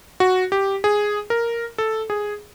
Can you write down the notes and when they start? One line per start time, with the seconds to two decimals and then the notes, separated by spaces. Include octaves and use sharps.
0.20 F#4
0.52 G4
0.84 G#4
1.30 A#4
1.78 A4
2.10 G#4